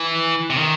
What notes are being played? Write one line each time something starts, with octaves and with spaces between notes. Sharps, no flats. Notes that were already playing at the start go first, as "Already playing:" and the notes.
Already playing: E3
C3
D#3